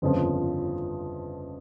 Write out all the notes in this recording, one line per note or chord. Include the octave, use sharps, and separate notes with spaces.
G1 F2 C#3 F3